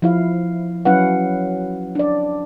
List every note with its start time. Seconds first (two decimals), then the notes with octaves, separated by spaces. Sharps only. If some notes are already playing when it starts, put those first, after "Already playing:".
0.02 F3 E4 F5
0.85 F#3 C#4 E4 B4 F5 F#5
1.95 D4 D5